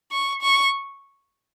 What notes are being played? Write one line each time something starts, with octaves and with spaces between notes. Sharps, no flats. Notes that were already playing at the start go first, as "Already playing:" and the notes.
C#6
C#6